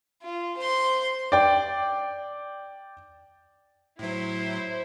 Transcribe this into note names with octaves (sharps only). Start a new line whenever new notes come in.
F4
C5 C6
D5 G5
A2 F#3 E4 C5